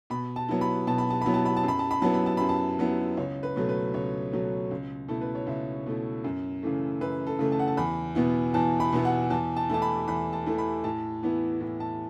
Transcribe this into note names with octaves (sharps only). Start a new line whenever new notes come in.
B2 B5
A5
F#3 B3 E4
B5
B2 A5
B5
A5
F#3 B3 E4 B5
A5
B5
A5
F#2 B5
A5
B5
F#3 B3 E4 A5
B5
A5
F#2 B5
A5
F#3 B3 E4
C#2 C#5
B4
B2 F#3 A3
B4
C#2 C#5
B2 F#3 A3
C#2
B2 A3 E4 A4
B4
C#5
C#2 E5
B2 A3 E4
F#2
C#3 E3 A3
F#2 B4
A4
C#3 E3 A3
A5
F#5
A5
E2 B5
B2 B3 E4
E2 A5
B5
B2 B3 E4
F#5
E2 A5
A5
E3 A3 E4 A5
B5
E2 B5
A5
E3 A3 E4
B5
A2 A5
E3 B3 E4
A2
A5